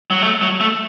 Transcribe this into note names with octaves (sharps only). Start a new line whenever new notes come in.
F#3
A3
F#3
A3